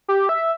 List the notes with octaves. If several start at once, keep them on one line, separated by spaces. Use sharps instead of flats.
G4
E5